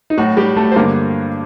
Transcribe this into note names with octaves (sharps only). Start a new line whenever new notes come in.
D#4
A2 F#3 F#4
G3 G4
A3 A4
C5
G2 D3 A#3 A#4